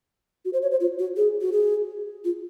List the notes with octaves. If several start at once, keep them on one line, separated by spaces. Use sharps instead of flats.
F#4
C5
C#5
C5
F4
F#4
G#4
F#4
G#4
F4